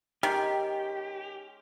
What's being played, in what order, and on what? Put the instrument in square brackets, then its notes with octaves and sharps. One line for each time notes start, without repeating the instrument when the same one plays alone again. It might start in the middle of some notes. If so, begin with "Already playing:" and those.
[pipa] D#3 [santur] G#3 C#4 [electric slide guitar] G4